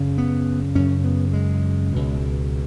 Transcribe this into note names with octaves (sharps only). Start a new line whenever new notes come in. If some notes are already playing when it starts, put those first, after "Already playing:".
Already playing: F#2 C#3
B3
F#2 C#3 C#4
B3
G#3
C#2 B2